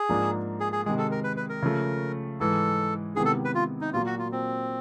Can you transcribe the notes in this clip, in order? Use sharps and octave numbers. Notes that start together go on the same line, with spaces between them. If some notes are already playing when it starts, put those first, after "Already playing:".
Already playing: G#4
G#2 F3 A#3 D4
G#4
G#4
C3 D#3 G#3 G#4
A4
A#4
B4
B4
A#4
C#3 F3 A3
G#2 E3 G#3 A4
C3 D#3 G#3 B3 E4 G#4
A4
B4
F4
D#4
A#2 F#3 A#3 F4
F#4
F4
C4